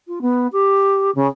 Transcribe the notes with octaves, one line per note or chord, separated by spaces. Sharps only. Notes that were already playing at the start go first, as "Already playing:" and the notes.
F4
B3
G4
C#3